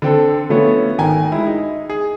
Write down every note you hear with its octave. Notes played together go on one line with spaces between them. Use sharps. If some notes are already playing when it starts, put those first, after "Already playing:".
D3 C4 A4
D3 F3 A3 B3 C#4
G#1 G5 G#5 A#5
G#3 E4
D#4
G#4